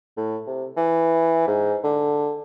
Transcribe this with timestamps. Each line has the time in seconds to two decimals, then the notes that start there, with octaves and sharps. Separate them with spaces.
0.17 A2
0.47 C3
0.77 E3
1.47 G#2
1.84 D3